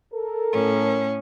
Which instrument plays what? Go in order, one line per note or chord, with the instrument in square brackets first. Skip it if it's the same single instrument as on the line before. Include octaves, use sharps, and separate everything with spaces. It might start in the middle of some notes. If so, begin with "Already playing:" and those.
[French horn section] A4 A#4
[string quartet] A2 C#4